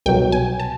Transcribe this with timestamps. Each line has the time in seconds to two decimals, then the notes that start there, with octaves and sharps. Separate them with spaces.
0.06 C2 B2 F#3 G5
0.32 G#5
0.60 A5